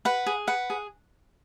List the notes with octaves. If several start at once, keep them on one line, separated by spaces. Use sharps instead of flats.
B4 F#5
G#4
B4 F#5
G#4